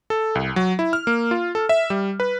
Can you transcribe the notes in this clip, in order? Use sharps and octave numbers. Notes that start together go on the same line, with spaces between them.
A4
C2
F#3
E4
F6
A#3
F4
A4
E5
G3
B4